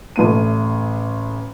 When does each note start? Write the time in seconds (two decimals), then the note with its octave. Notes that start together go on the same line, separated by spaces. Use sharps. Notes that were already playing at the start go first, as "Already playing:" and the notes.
0.16 A1 A3 D#7